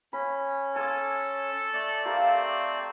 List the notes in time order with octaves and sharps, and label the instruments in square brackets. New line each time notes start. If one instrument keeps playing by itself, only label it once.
[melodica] C#4 [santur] B5
[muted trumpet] A4 [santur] G#5 C6 D6
[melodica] A3 D5
[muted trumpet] C4 [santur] G4 A#4 F5